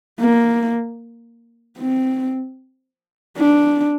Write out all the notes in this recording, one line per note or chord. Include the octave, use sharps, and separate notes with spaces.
A#3
C4
D4